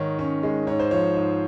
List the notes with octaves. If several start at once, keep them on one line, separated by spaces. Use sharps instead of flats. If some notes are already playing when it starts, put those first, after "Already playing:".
Already playing: G#2 D#3 C#5
C#4
G#3
G#2 C#5
C5
F3 C#5
G#2